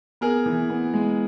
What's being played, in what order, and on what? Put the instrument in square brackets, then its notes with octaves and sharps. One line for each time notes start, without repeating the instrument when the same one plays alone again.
[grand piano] B3 G#4 A#4
E3
B3
G#3